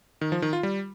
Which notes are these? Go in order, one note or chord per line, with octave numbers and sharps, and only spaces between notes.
D#3
F3
D#3
F4
G3